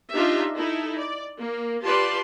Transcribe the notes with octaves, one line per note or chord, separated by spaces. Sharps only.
D4 D#4 F4 G4 E5
D#4 E4 A4
D5
A#3
F4 G4 B4 D5 A5 C6